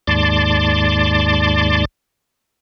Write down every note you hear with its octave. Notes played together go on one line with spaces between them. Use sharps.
D#2 G#2 D5 A5 C6 D6